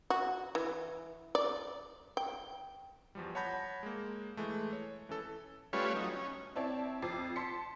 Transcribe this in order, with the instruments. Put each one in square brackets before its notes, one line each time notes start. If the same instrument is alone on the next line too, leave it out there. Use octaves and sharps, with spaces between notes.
[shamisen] F#4
E3
D5
G5
[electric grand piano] E2 F3 G3
C#5 F#5 A5 B5 G6 A#6
G#3 A#3
E3 G#3 A3
C#5
E3 C#4 A4
[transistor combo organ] G3 A3 C#4 F4 B4 C#5
F#3 D#4
C#4
[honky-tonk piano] C4 E4 C#5 D5 A5
F2 C4 D6 A6 C7
A5 C6 B6 C#7